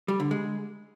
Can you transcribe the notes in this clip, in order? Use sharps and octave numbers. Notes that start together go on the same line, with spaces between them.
G3
D3
G#3